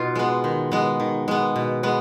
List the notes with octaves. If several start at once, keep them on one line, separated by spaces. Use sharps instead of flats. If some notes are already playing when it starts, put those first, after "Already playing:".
Already playing: B2 D#4 F4
G#3 B3
D#3
G#3 B3
D#3
G#3 B3
B2
G#3 B3